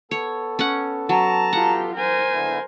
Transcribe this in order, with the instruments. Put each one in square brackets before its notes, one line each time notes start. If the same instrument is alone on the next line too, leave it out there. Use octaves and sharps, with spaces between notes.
[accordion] B3 A4 [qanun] C#5
[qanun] C#4 F#5
[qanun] F#3 [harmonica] A5 A#5
[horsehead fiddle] F4 G4 [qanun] F#5
[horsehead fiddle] A#4 C5 [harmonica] G#5
[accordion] D3 B3 E4